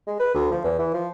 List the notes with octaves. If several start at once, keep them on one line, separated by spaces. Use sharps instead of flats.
G#3
B4
D2
F3
E2
E3
F3